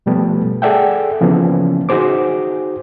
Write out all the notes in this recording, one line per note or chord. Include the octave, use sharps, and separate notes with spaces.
B2 F3 G3 A3 B3
G#4 A4 D5 E5 F#5 G5
C#3 E3 F3 A#3 B3 C#4
D#4 F#4 G#4 C5 D6